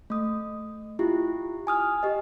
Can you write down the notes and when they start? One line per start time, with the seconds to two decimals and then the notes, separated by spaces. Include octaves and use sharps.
0.10 A3 D#6
0.99 E4 F4 G4
1.67 G#5 D#6 F6
2.03 G4 D#5